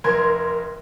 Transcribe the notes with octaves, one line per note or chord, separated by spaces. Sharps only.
F1 A#4 C6 G#6